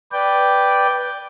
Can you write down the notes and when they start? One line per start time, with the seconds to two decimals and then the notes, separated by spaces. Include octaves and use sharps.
0.12 B4 D5 G5